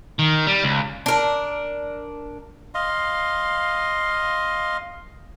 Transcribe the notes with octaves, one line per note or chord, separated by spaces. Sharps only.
D#3
G3
C#2
D4 A#4
D#5 F5 C6